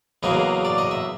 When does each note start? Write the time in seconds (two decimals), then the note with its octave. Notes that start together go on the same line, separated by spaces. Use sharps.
0.23 E2 C#3 F#3 A#3 D#5
0.65 D5
0.78 D#5
0.91 E5